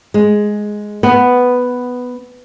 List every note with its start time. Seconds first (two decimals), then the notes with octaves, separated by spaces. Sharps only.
0.14 G#3
1.03 B3